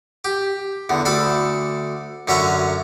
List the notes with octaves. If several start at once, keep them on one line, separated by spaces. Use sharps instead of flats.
G4
E2 D3
D2 D4 A4 B5
F#2 D3 C#4 E5 A#5 C#6